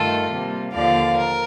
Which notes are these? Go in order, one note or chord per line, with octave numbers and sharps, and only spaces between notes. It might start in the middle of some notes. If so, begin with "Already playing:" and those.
Already playing: G2 D#3 A3 F4 A4
C3 G3 A#3
D#2 D3 F3 A#3 D5 F5
A#4